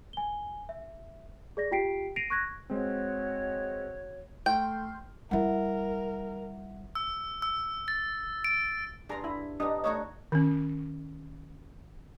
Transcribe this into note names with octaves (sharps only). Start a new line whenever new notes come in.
G#5 G7
E5
G#4 D5 A#6
F4 G4 G5 B6 C7 D7
A#6 C7 D7 D#7 F7
C#6 F#6 G#6 A#6
G#3 C4 F#4 C#5
A3 G5 C6 F6 G6
G3 E4 A#4 E5 F#5
E6
E6
A6
D7
G2 D4 F4 G#4 A#5
E4
B3 D4 D#4 G4 D#5
A3 D4 D#4 F#4 C#5
D#3 C#4